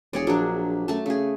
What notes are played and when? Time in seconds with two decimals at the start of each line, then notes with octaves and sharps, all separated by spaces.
0.13 E1 G#4 C#5 D5
0.27 A#1 F#3 D4
0.88 F#2 A3 A5
1.06 C#3 A3 G#4